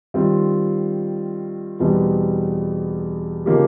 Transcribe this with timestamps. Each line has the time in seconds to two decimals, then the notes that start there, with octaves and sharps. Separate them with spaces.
0.14 D#3 G3 C4 F4
1.80 E2 B2 G3 C4
3.46 C#3 F3 A#3 D#4 G4